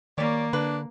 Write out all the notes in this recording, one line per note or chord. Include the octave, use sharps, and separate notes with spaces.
D#3 G3 A#3 C#5 D5
D3 D4 B4